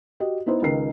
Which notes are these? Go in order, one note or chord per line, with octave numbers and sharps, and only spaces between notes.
F#4 G4 D#5
B3 D#4 E4 C5
C#2 D#3 A#4 C7